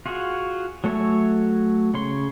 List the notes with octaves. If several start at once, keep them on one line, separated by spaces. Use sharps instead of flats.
F4 F#4 G#4
F#3 A3 C#5 E5 G#5
C#3 C#5 C6